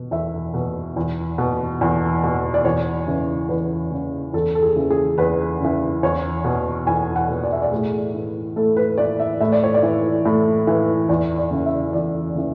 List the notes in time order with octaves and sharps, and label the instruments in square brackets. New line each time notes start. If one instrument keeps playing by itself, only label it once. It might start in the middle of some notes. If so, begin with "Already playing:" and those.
Already playing: [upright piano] B2
E2 E5
B2
E2
B2
E2
B2
D5
E2 C#5
C#3 E3
E2 B4
C#3 E3
E2 A4
A4
G#4
C#3 E3
G#4
E2 B4
C#3 E3
E2 C#5
B2
E2 G#5
F#5
B2
D5
E5
D5
A2 G#4
E3
A2 A4
B4
E3 D5
E5
A2 E5
D5
C#5
D5
E3
A2
E3
E2 D5
D5
C#3 E3
E5
E2 D5
C#3 E3